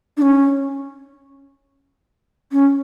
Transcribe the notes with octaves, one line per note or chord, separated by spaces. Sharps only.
D4
C#4
C#4